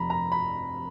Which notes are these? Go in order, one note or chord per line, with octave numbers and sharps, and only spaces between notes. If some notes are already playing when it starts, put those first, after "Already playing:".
Already playing: F1 F2 C3 A#5 B5
A#5
B5